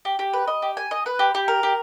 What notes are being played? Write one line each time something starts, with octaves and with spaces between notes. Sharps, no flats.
G4
G4
B4
D#5
G4
G#5
D#5
B4
G4
G4
A#4
G4